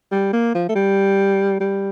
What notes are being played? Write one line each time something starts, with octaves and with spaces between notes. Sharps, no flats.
G3
A#3
F3
A3
G3
G3